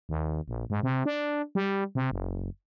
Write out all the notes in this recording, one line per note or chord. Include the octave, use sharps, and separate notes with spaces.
D#2
A#1
G#2
C3
D4
G3
C3
F#1